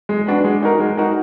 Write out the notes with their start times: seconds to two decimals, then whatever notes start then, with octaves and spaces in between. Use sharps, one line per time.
0.09 G#3
0.27 D4 F#4 B4
0.44 G#3
0.63 D#4 F#4 A#4
0.80 G#3
0.97 D#4 F#4 A#4